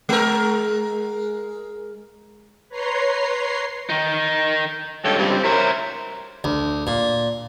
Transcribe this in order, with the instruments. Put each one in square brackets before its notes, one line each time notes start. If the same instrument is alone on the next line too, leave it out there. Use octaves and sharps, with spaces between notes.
[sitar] G#3 A#4
[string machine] B4 C#5 A#5 C6 C7
[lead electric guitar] D#3 D#4
[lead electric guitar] C#2 G2 [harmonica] A4 C#5 G5
[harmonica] G3 C4
[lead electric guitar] E4 C5 [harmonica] A#4 C#5
[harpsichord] D2
A#2